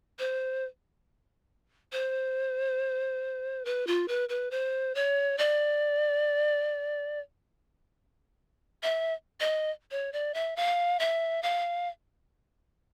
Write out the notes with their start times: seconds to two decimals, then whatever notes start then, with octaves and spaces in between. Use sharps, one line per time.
0.19 C5
1.92 C5
3.65 B4
3.87 F4
4.08 B4
4.29 B4
4.51 C5
4.95 C#5
5.38 D5
8.83 E5
9.40 D#5
9.91 C#5
10.13 D5
10.34 E5
10.56 F5
10.99 E5
11.43 F5